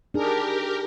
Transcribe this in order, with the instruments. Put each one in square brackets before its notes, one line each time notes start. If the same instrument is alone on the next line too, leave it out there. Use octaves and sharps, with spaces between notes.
[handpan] D4 D#4 G#4 [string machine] G4 A#4